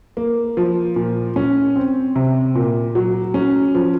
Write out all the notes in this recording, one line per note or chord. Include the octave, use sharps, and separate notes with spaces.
A#3
F3
A#2
C#4
C4
C3
A#2
F#3
C#4
F3